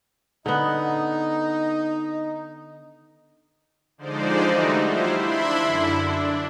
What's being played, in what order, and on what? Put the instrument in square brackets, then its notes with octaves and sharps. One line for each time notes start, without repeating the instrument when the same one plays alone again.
[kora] D3 B3 [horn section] D#4 D#5
[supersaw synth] D3 F3 G#3 D#4 C5 D5
E3 G3 A3 D#4 F#4
E4 F4 G4 C5
D4 E4 E5 B5 C6
F#2 D3 E4
D4